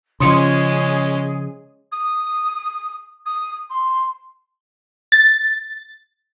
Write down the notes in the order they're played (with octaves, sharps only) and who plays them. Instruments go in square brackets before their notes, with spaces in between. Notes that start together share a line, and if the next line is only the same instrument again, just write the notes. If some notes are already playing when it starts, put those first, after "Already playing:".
[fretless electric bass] C#3 F3 [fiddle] G#3 C#4 [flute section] G#4 [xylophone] C6 D#6 C#7
[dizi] D#6
D#6
C6
[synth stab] A6